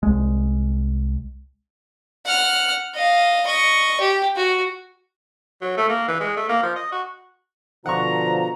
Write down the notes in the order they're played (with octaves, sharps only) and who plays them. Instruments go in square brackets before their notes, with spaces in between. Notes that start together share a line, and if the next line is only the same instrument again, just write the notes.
[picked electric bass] C2 G#3
[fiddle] F#5 F6
D#5 F5
D#5 C#6
G4
F#4
[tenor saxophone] F#3
A3
A#3
E3
G#3
A3
A#3
F3
D#5
F#4
[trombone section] B2 D3 F3 [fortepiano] F#5 C#6 [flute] A#5